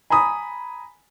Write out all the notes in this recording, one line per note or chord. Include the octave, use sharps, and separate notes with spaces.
G#5 A#5 B5 D#6